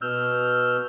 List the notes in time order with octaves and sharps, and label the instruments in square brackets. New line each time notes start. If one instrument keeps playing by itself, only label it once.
[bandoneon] B2 E6 F6 G6